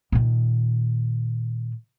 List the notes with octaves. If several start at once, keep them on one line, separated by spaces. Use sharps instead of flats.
A#2 D#3